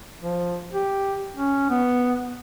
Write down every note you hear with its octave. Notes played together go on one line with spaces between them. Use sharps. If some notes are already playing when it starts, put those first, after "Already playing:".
F3
G4
C#4
B3